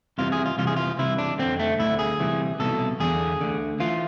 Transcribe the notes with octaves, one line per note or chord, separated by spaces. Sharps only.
C2 C3 E3 F4
G#4
F4
C2 C3 E3 F4
G#4
F4
C2 C3 E3 E4
D4
F2 D3 C4
A3
D2 D3 E4
G#4
C2 C3 E3
C2 B2 A4
E2 D3 G#4
D2 D3
E3 F4